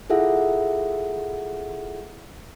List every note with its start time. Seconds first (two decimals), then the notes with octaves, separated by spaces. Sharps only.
0.10 E4 F4 G#4 A4 E5 F#5